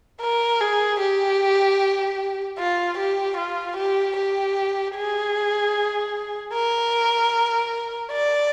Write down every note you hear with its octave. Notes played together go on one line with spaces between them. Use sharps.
A#4
G#4
G4
F4
G4
F4
G4
G4
G#4
A#4
D5